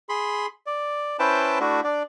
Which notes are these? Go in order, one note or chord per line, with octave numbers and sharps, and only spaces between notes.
G#4 B5 C6
D5
C#4 E4 B4 C5 G5 A5
A3 D4 E4 F#4
D4 D5